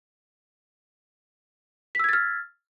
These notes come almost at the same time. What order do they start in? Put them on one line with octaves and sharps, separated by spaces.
B6 E6 G#6 A6 F6